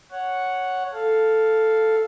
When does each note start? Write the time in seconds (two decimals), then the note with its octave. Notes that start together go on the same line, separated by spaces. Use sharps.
0.11 C#5 F#5
0.93 A4 F5